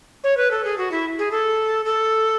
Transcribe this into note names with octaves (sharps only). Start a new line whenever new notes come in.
C#5
B4
A4
G#4
F#4
E4
G#4
A4
A4